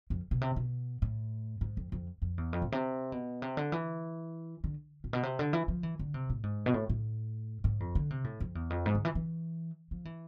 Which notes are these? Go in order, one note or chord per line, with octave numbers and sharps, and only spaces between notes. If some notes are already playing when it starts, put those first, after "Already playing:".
F2
B2
C3
B2
A2
G#2
F2
F2
F2
E2
F2
A2
C3
B2
C3
D3
E3
D3
A2
B2
C3
D3
E3
F3
E3
D3
C3
A2
G#2
B2
A2
A2
G#2
F2
D3
C3
A2
F2
E2
F2
G#2
D3
E3
E3
F3
E3